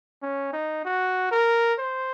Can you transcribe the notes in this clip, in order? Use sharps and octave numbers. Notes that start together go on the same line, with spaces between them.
C#4
D#4
F#4
A#4
C5